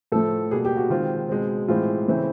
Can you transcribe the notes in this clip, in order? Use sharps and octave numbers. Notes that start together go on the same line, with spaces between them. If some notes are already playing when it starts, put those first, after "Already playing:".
A2 F3 A3 A4
B2 G3 A#3 G#4
G4
F#4
D#3 G#3 C4 F4
B2 G#3 C4
A2 E3 G#3 C4 F4
C#3 E3 A3 C4